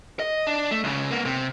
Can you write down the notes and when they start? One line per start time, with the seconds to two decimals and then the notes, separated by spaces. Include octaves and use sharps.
0.20 D#5
0.47 D4
0.71 A3
0.84 C#2 C#3
1.11 A#3 B3
1.25 C3